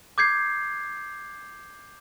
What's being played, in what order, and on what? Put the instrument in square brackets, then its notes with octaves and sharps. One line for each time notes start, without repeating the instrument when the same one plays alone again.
[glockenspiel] D6 G6 G#6 C7